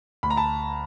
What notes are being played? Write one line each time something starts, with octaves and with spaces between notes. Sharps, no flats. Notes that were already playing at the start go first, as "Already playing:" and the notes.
D2 B5
A#5
A5 B5